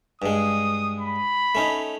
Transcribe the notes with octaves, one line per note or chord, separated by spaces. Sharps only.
G2 G#3 D#6
B5
A3 C#4 D#4